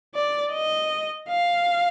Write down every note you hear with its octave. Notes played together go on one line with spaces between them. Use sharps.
D5
D#5
F5